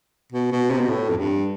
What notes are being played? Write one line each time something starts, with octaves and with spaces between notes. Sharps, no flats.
B2
B2
C3
B2
A2
F2
G2